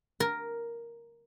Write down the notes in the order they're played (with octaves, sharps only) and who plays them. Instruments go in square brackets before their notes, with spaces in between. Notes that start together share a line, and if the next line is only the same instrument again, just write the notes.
[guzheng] A#4